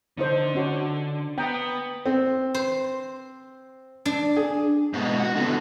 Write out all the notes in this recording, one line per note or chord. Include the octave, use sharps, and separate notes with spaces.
D3 D4 D#4 C5
C#4 F#4
B3 G5 A#5 D#6
C4
C5
D4
G#4
G#2 B2
F#4 F#5
D3 B3